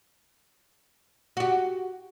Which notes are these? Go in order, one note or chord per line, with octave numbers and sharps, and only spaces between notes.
F#4 G4